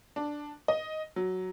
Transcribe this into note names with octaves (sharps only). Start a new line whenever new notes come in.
D4
D#5
F#3